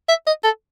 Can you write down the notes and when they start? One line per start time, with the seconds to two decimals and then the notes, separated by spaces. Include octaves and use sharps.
0.09 E5
0.27 D#5
0.44 A4